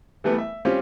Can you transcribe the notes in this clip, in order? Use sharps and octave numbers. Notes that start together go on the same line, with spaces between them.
E3 G3 A3 B3
E5
G3 C4 C#4 F4 G4